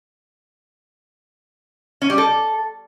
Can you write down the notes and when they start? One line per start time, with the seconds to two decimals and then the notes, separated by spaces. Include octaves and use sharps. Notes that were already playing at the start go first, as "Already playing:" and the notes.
2.02 C#4
2.10 G3
2.18 A4